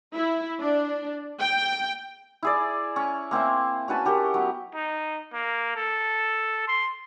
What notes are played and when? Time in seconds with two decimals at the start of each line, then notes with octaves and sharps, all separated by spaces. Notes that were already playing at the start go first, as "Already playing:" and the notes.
0.13 E4
0.60 D4
1.39 G5
2.43 E4 G#4 D5
2.96 C#4
3.31 A#3 C4 C5 E5
3.88 C#4 F#4 B4 A5
4.05 F#4 G4 A#4
4.34 F#3 B3
4.74 D#4
5.33 A#3
5.76 A4
6.68 C6